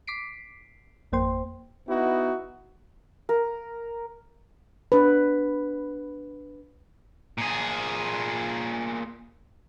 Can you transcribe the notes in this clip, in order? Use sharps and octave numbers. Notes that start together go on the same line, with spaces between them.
D6 B6 C7 D7
G#1 F2 A#3 C5 G5 C6
B3 D#4 E4 F#4
A#4
D4 B4
A#2 G#4